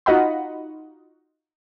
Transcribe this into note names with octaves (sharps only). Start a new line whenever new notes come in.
D#4 F4 F#4 D#5 F#5 B5